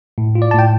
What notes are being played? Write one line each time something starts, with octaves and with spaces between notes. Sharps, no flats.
A2
F4
D5
A5
A2 G5